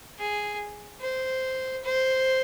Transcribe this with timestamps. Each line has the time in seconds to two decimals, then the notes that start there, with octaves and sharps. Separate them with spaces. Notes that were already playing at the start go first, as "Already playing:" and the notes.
0.19 G#4
1.01 C5
1.84 C5